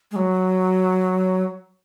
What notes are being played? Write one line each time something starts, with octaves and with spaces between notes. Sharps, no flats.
G#3
F#3